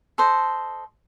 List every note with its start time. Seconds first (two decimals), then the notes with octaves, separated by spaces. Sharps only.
0.18 A4 C5 D#5